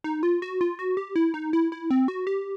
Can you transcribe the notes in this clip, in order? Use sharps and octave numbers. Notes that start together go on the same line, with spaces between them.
D#4
F4
F#4
F4
F#4
G4
E4
D#4
E4
E4
C4
F#4
G4